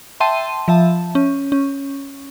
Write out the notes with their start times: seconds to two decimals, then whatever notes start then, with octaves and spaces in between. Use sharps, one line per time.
0.20 E5 G5 A5 C6 D#7
0.68 F3 E5 A5
1.15 C#4
1.52 C#4